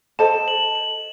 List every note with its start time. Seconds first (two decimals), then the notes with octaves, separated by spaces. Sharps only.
0.19 A4 C5 D#5 A5 E7
0.48 F#7
0.75 F#7